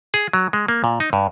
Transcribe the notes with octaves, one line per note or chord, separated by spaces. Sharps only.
G#4
F#3
G#3
A#3
A#2
D#4
G2